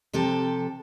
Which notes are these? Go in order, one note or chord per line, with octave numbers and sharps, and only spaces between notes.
C3 F3 G4 A4